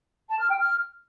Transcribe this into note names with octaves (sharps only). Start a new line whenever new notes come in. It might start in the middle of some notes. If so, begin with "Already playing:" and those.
A5
F6
G5
F6